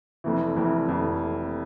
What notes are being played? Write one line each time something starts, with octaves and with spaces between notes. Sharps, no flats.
F1 F2 E3
F1 F2 E3
F1 F2 E3